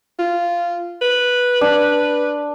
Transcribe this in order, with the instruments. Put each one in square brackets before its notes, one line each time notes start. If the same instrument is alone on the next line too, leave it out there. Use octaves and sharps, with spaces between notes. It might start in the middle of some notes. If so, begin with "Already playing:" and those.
[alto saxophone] F4
B4
[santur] D4